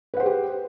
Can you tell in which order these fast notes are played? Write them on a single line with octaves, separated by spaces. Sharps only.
B4 F#5 C5 G#4 G4